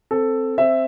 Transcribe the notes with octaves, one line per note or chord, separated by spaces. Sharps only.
C4 A4
C4 E5